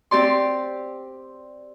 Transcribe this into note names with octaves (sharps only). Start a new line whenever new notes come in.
C4 G4 D5 C6